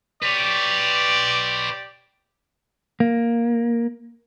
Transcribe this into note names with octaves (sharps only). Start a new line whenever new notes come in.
G4 B4 C#5 D5
A#3